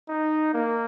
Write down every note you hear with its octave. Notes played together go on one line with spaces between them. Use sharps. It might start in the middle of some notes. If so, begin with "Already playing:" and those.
D#4
A#3